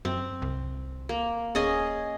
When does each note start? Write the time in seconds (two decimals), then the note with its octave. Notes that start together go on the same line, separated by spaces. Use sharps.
0.05 F#2 C4
0.42 C2
1.09 A#3
1.55 D1 C#4 G#4 D#5